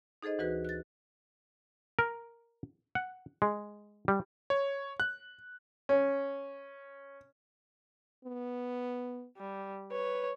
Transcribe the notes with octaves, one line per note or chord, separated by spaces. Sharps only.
D#4 G#4 A4 C5 D#5
D2 E3 F#4 B4 F#6
F#6 A6
A#4
F#5
G#3
G3
C#5
F#6
C#4
B3
G3
B4 C#5